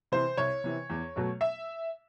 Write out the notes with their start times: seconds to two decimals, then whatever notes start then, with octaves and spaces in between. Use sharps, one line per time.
0.12 C3 E3 C5
0.37 C2 C#5
0.64 C3 E3
0.90 E2
1.16 B2 F#3 A3
1.41 E5